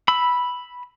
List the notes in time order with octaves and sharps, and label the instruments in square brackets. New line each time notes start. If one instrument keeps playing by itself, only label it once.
[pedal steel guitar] B5 E6